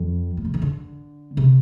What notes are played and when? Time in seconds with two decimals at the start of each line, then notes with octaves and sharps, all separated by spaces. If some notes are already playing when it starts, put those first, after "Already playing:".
Already playing: F2
0.37 A2
0.45 C3
0.54 E3
0.62 D3
1.37 C3